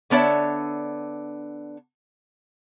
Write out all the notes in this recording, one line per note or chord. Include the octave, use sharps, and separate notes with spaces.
D3 B3 D4 C#5 E5